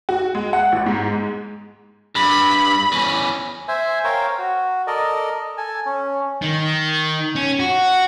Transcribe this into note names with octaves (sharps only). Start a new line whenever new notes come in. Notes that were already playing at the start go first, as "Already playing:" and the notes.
F#4
G#3
F#5
A1
G#2
G#3
G2 B5
E2 C#4
C5 E5 G#5
A#4 C5 C#5 F5 G5
F#4
A4 A#4 D5 D#5
A4 G#5
C#4
D#3
C#4
F#4